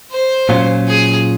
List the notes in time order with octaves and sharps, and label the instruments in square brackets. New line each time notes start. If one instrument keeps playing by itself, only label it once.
[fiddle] C5
[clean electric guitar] A#2 F#3 C#4 F4
[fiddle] G#4